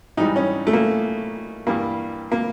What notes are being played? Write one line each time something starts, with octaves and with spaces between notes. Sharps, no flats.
G#2 E3 G3 D#4
C#4
A3
A#3
G2 E3 G3 A#3
A#3